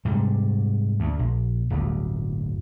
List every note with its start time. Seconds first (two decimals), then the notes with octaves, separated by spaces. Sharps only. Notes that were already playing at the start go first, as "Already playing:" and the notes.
0.05 G#2 C3 G3
1.00 D2
1.19 A#1
1.70 D1 G1 D2